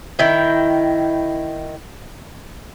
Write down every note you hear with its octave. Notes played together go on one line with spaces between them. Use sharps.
D#3 E4 G5